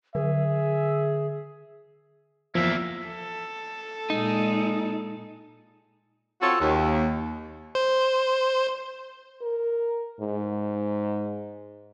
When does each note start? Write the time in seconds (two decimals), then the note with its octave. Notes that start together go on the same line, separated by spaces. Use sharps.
0.15 D3 G#4 E5
2.55 E2 F3 A#3 E5
3.07 A4
4.10 A#2 G#3 D#4
6.42 C4 F4 F#4 A4 C#5
6.60 D#2
7.75 C5
9.42 A#4
10.21 G#2